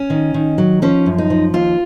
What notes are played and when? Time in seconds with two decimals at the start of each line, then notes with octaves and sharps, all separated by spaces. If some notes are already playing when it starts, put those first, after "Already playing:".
Already playing: C#4
0.10 D#3
0.34 D#3
0.58 F#3
0.82 F3 C#4
1.06 F#2
1.18 D#4
1.30 F3
1.54 D#2 F4